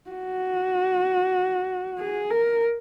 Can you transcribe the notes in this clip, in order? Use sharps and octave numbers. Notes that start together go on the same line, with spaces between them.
F#4
G#4
A#4